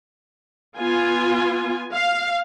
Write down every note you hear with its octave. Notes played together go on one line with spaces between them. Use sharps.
B3 F4 G#5
F5